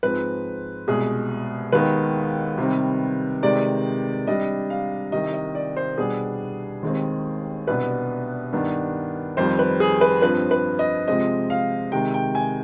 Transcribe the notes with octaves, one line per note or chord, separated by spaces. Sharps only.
G#2 F3 C4 B4
C2 B2 G#3 G#4
D#2 D#3 G#3 B3 B4
C3 D#3 G3 C4
C3 D#3 G#3 D5
C3 G3 D4 D#5
F5
C2 C3 D#3 D#5
D#5
D5
C5
B2 G3 B3 D4 G#4
D#2 D#3 G#3 C4
C2 B2 B3 D4 B4
G2 D#3 B3 D4
F2 D#3 G3 C5
B4
G#4
B4
G2 F3 C4 B4
B4
D#5
C3 F3 G#3 C4 D#5
F5
C3 D#3 G#3 G5
G5
G#5